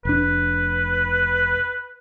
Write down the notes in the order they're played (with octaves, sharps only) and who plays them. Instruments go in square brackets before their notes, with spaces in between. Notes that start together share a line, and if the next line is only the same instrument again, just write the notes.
[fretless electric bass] F1 D4 [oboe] B4